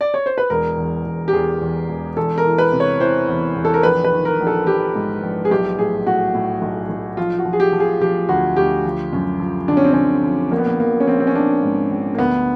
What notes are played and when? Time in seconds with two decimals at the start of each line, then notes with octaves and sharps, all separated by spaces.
0.01 D5
0.14 C#5
0.26 C5
0.38 B4
0.50 E1 A#4
0.77 E2
1.05 E1
1.28 G4
1.33 E2 G#4
1.62 E2
1.89 E1
2.16 E2 A4
2.38 A#4
2.45 E3
2.58 B4
2.72 C3
2.80 C#5
3.00 E3 C5
3.28 E2
3.56 E2
3.65 A4
3.74 A#4
3.83 A#1 B4
4.04 B4
4.12 D#3
4.25 A#4
4.40 A#1
4.47 A4
4.67 A#1 G4
4.95 G#2
5.23 A#1
5.45 G#4
5.51 B1 G4
5.78 A2 G#4
6.06 A2 F#4
6.34 A2
6.62 B1
6.90 B1
7.17 F3 F4
7.39 F#4
7.46 F3
7.53 G#4
7.60 G4
7.73 F3
7.80 G#4
8.01 F3 G4
8.29 D2 F#4
8.56 D2 G4
8.85 F3
9.13 F#2
9.40 F3
9.68 D3 D4
9.77 C#4
9.85 C4
9.93 F#2 C#4
10.23 F3
10.51 A#1 A#3
10.58 B3
10.66 A#3
10.79 A#1 A#3
11.00 C#4
11.07 A#1 C4
11.20 C4
11.27 C#4
11.34 A#1 D4
11.63 G#2
11.90 A#1
12.15 A#3
12.18 D2 B3